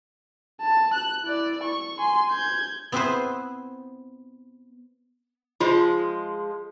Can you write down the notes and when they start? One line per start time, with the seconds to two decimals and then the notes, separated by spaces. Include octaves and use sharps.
0.61 A5
0.94 F#6
1.24 E4 D5
1.63 C#6
1.99 G#5 C6
2.31 G6 G#6
2.92 B3 C4 E4 G#4 B4 C5
5.60 F3 G#3 F4